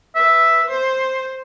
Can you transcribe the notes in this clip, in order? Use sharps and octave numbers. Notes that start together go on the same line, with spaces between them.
B4 E5
C5